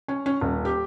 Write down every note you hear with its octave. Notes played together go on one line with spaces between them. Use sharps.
C#4
C#4
D#1
G4